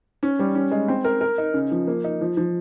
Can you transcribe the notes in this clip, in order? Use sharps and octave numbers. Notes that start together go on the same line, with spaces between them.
C#4
G3
C#4
G#3
C4
A#4
A#4
D#4
C#3
F3
A#3
D#4
F3
F3